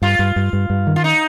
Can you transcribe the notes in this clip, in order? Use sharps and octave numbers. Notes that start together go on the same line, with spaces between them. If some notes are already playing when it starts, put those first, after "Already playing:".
G2 F4
G2
G2
G2
G2
D#3
F4
D#4